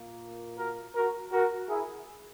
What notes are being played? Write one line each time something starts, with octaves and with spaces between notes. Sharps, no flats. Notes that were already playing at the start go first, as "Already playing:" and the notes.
Already playing: A#2 A#3
F#4 A#4
F#4 A#4
F#4 A#4
E4 G#4